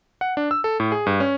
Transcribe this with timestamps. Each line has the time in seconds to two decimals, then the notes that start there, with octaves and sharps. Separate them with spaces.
0.21 F#5
0.37 D4
0.51 E6
0.64 A4
0.80 A2
0.92 G#4
1.07 G2
1.20 C#4